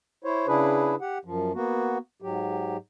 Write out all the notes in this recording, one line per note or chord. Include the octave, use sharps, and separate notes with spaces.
E4 C5 C#5
C#3 D4 E4 G#4 B4
G4 F#5
F#2 F3
A#3 B3 F#4
G#2 F#3 G4